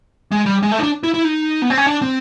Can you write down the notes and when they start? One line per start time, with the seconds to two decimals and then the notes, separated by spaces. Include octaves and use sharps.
0.31 G#3
0.46 G3
0.63 G#3
0.72 A3
0.79 D#4
0.83 D4
1.03 E4
1.14 E4
1.24 D#4
1.62 B3
1.70 C4
1.78 C#4
1.86 D4
2.02 C4